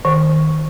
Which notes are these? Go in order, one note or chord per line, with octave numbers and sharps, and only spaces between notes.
D#3